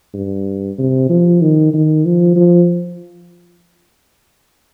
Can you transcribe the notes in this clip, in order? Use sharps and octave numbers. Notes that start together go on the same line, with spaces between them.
G2
C3
F3
D#3
D#3
F3
F3